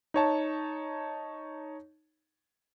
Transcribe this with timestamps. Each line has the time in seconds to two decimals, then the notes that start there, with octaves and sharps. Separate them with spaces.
0.14 D#4 C#5 A5